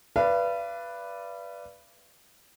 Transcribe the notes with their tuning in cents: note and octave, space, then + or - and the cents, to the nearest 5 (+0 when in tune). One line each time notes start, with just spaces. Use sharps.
B4 +0 D5 +0 F5 -40